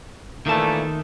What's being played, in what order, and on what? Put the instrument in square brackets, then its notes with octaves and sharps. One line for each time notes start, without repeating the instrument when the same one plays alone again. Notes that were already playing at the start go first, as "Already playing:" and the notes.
[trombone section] A#2 E3 A3 [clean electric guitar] D#3 A5